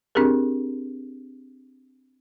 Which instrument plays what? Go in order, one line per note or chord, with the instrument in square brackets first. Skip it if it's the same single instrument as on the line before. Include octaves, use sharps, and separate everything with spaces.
[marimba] C4 D4 G4 G#4 A#4